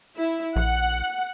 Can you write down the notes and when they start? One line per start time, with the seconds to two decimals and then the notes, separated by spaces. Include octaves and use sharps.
0.15 E4
0.56 A#1 F#5